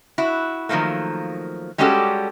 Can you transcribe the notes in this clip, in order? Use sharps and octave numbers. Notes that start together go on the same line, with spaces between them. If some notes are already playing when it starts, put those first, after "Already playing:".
E4 F#4
D#3 F3 F#3 A3 A#3
G3 G#3 C#4 F#4 G4 A4